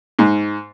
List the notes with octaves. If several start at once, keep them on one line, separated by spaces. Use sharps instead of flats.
G#2